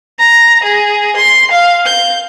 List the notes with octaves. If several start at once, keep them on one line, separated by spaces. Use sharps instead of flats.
A#5
G#4
C6
F5
G6